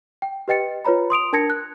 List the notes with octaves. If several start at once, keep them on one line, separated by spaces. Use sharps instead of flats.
G5
G4 B4 D#5 G5 A6 C#7
F4 B4 C#5 A#5 B5
C6 D#6 D7 F7
D4 A#4 A5 G#6 A#6 C#7
F#6